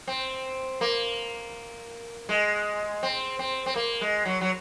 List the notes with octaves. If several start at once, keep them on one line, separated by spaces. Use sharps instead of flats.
C4
A#3
G#3
C4
C4
C4
A#3
G#3
F#3
F#3